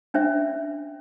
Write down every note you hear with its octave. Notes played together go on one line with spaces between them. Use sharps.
C#4 D4 C5 E5